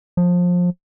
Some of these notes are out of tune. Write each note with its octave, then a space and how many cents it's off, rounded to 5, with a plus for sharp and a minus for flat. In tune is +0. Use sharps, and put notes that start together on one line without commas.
F3 +25